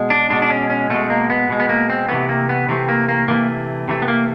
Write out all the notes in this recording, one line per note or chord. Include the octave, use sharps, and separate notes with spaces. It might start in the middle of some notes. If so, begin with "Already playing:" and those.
Already playing: B2 G#3
D4
B2 G#3 D4
D4
C#4
C#4
B2 G#3 A3
A#3
B3
B2 G#3
B3
A#3
C4
C3 E3 A3 B3
A#3
B3
C3 E3 A3 C4
A#3
A#3
C3 E3 A3 A#3
C3 E3 A3
B3
A#3